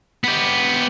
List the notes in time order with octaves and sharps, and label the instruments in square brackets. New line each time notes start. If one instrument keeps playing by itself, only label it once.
[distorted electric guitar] B3 G4